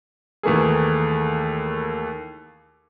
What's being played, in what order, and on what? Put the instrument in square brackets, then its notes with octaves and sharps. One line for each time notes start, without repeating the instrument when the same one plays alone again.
[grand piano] D#2 E3 A3 A#3 G#4